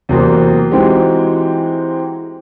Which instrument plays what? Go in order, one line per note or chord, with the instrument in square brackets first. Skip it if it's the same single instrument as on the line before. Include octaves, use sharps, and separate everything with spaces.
[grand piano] E2 C3 F#3 A#3 C4
E3 G#3 C4 D#4 F#4 G4